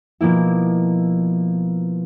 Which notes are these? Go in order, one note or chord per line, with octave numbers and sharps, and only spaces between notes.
B2 F3 A#3 E4